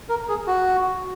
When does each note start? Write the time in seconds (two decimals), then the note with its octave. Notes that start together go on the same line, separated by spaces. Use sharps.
0.09 A#4
0.29 G#4
0.47 F#4